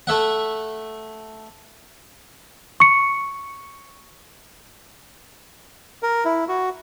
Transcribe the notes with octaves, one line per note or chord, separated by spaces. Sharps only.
A3 E5 F#5
C#6 C#7
A#4
E4
F#4